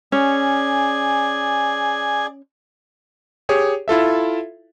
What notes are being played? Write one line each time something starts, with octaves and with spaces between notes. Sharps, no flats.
C#4 G#4 D5 G#5
G4 G#4 C#5
E4 F4 A4 E5